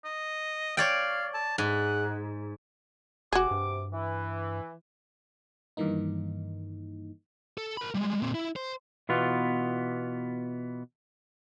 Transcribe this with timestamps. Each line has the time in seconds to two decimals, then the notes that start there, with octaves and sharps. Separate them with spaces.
0.04 D#5
0.77 C#5 D5 F5 G5
1.34 A5
1.58 G#2 F#5
3.33 F1 C3 F#4 G#4 D6
3.51 G2
3.93 E3
5.77 G2 D#3 E3 A#3 D#4
7.58 A4
7.77 A#4 B5
7.95 G3 G#3
8.22 A#2 C4
8.35 E4
8.56 C5
9.09 B2 E3 B3 F4